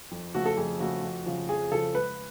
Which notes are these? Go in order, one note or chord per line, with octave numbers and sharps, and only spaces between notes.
F2
C#3 F3 A3 F#4
A4
F2 G#4
C#3 F3 A3 F#4
F2
C#3 F3
F2 G#4
C#3 F3 A4
C#2 B4